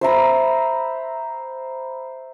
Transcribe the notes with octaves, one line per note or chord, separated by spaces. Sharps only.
C5 E5 A#5 B5